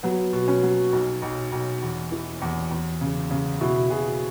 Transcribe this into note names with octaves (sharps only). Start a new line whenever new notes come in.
F#3 B3
B2
C#4
F#3
B1
B1
B1
E2
E3
E2
E2
C#3
C#3
B2 E4
B2 G#4